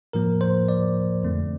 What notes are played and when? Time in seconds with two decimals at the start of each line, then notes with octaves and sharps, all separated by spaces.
0.13 A2 F3 A#3 A#4
0.41 C5
0.68 D5
1.23 F2 D3 A3 C4